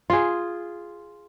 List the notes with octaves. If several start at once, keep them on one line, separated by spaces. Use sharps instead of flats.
F4 G#4